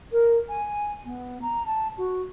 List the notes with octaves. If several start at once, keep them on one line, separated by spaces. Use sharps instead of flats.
A#4
G#5
B3
A#5
A5
F#4